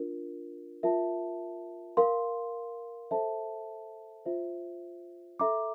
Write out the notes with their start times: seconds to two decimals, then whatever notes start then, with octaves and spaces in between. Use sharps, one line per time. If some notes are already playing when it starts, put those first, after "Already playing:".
Already playing: D4 F4 A#4
0.83 F4 A#4 E5 A5
1.97 A#4 F5 C6
3.11 A4 C5 E5 A5
4.26 F4 C5 E5
5.39 A4 E5 A#5 D6